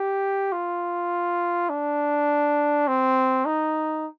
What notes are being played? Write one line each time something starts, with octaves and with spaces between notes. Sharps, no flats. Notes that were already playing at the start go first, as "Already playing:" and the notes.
Already playing: G4
F4
D4
C4
D#4